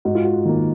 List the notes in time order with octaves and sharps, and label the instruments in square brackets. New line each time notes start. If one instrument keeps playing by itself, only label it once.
[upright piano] G#2 F#4
F4
F#4
D#3 A#3